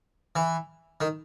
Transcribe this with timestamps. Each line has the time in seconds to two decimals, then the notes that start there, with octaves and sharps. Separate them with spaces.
0.36 E3
1.01 D#3